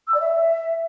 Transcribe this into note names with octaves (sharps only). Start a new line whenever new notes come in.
E6
D5
E5